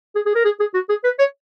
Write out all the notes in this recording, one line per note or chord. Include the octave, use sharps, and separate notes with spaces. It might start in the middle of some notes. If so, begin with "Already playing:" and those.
G#4
G#4
A#4
G#4
G#4
F#4
G#4
B4
C#5